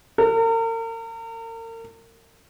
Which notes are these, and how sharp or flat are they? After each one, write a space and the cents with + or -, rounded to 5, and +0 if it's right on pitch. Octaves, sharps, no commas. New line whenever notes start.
A#4 -40